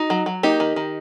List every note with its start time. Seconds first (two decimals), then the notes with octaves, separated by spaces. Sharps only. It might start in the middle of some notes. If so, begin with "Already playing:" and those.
Already playing: D#4 F#4
0.10 F#3
0.26 F#3
0.43 A#3 D#4 G4
0.60 D#3
0.76 D#3